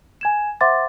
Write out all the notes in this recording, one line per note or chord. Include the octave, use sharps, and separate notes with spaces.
G#5 G#6 E7
C5 E5 F#5 C6 D6 A6